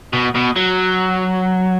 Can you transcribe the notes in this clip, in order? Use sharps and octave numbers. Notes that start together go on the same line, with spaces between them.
B2
B2
F#3